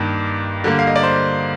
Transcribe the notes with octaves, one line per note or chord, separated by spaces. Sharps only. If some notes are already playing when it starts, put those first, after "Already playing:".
Already playing: G2 D#3 A#3
D3 G3 A#3
F5
D#5
D5
C5